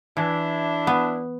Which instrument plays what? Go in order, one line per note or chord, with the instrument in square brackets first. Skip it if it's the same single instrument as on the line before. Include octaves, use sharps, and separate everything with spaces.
[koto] E3 [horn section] D4 E4
[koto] B3